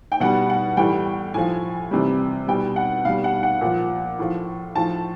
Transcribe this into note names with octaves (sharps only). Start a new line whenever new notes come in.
G5
B2 G3 F#5
F#5
A2 E3 G3 G5
A2 F3 G#5
C3 E3 G3
B2 G3 G5
F#5
B2 G3 F5
F#5
F#5
A#2 F3
A2 F3
A2 F3 A5